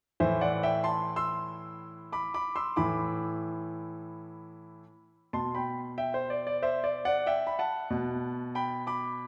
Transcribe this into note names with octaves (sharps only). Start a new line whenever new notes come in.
A2 E3 C5 E5
D5 F#5
E5 G5
A5 C6
C6 E6
B5 D6
B5 D6
C6 E6
A2 E3 B5 D6
B2 A5 C6
G5 B5
E5 G5
C5
D5
D5
C5 E5
D5
D5 F#5
E5 G5
B5
F#5 A5
B2
G5 B5
B5 D6